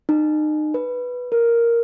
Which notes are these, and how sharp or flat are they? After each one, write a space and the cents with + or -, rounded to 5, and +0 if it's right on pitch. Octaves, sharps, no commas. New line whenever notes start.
D#4 -35
B4 -5
A#4 +0